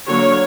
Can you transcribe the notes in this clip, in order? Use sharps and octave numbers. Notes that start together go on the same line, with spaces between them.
D3 F#3 A#3 C#5